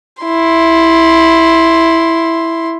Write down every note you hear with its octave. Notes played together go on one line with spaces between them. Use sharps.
E4 C6